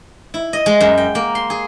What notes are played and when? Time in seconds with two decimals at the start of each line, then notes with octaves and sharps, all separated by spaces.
0.34 E4
0.53 D#5
0.66 G#3
0.80 F#2
0.98 G5
1.15 A#3
1.35 C6
1.50 G#4